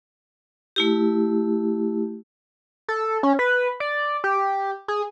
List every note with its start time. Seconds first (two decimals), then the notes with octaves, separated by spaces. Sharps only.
0.76 A3 E4 G4
2.88 A4
3.23 C#4
3.39 B4
3.80 D5
4.24 G4
4.88 G#4